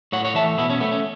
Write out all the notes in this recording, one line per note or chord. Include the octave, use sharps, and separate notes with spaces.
A2 C#5 F#5
C#5 F#5
E3 A3 E5 A5
B2 B3 E4
C#4
A3 B3
C#4